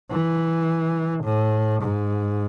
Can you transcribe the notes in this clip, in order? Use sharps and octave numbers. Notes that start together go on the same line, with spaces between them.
E3
A2
G#2